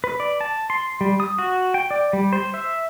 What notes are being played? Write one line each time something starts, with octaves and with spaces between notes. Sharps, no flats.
B4
D5
A5
C6
G3
D#6
F#4
G5
D5
G3
C5
E5